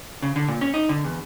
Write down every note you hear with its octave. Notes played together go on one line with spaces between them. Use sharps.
C#3
D3
A#2
C#4
D#4
D3
E2